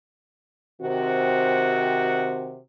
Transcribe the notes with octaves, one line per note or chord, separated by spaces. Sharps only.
C3 D#3 C4 F#4